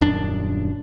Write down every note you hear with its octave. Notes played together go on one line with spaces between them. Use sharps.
D#1 F#2 D4